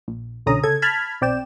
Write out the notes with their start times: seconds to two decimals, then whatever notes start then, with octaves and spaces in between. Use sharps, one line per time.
0.08 A#1
0.46 C2 B2 D3 C#4 A#5 D#6
0.64 C#3 A4 G#6
0.82 A5 B5 F6 G#6
1.21 B1 C4 D5 G5 E7